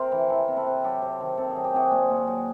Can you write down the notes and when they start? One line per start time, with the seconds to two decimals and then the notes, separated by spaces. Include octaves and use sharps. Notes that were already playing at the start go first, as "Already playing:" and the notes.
Already playing: C3 A#4 C5
0.12 E3
0.30 E3 A4 B4
0.48 C3
0.57 A4 B4
0.66 C3
0.84 F#3 G4 A4
1.02 C3
1.20 D#3
1.37 C3 A4
1.50 G#4
1.56 F#3
1.64 G4
1.74 C3 F#4 G#4
1.91 A#2
2.10 A#2
2.27 F#3